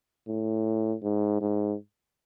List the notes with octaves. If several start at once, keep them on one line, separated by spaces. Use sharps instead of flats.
A2
G#2
G#2